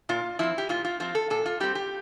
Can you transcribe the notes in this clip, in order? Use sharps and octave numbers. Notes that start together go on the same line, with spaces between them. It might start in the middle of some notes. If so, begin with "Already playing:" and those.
A#2 F4
F3 C4 E4
G4
A#2 F4
F4
F3 C4 F4
A4
A#2 A4
F4
G3 C4 G4
G4